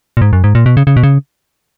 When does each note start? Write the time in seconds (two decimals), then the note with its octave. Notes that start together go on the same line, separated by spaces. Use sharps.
0.17 A#2
0.22 G#2
0.33 F#2
0.44 G#2
0.55 A#2
0.66 B2
0.77 C#3
0.87 C#3
0.97 B2
1.03 C#3